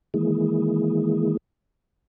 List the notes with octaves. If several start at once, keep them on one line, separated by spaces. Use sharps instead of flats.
D#3 E3 G#3 A#3 E4 G#4